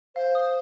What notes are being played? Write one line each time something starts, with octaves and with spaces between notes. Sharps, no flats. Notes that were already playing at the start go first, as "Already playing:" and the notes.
C5 F5
D#6